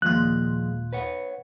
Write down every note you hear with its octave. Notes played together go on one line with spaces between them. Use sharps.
D#2 A#2 F3 G#3 F4 F#6
B4 C#5 F#5